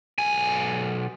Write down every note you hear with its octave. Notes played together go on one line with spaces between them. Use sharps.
B1 G#5